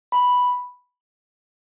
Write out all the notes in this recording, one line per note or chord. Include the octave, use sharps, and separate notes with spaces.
B5